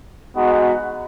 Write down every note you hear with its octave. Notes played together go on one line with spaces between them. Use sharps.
G#3 B3 D#4 F#4